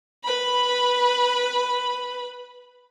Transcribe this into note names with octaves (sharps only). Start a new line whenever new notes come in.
B4 B5